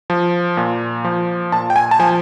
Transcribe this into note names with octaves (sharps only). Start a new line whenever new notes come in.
F3
A#2
F3
A#2 A5
G5
G#5
A5
F3 G#5